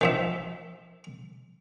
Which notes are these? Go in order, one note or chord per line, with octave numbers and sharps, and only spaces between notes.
D#3 F3 E5